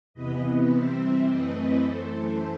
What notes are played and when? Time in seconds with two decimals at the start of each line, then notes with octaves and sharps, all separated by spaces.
0.14 E2 C3 E3 B3 B4 D#5
0.71 C3 E3 G3 C4 C5 E5
1.27 F#2 E3 A3 C4 B4 D#5
1.84 F#2 E3 A3 A4 C5